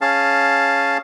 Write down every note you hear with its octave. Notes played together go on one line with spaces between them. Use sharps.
C#4 G#4 F5 A5